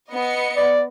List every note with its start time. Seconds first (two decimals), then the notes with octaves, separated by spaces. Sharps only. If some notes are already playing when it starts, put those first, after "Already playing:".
0.12 B3 D#5 C#7
0.56 D5